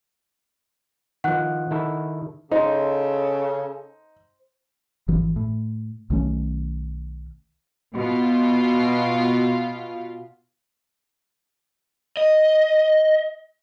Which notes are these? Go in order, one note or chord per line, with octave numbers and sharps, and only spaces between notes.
D#3 F3 F#5 F#6
D#3 E4 A4
C#3 D#4 A4 C5
G#1 E3 F3
A2
B1 D#3 A3 C#4
B2 F4
D#5